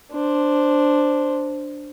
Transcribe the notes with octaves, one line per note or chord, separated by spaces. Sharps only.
D4 C5